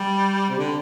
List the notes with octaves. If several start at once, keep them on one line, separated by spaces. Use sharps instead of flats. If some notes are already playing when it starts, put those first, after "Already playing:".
Already playing: G3
C3
D3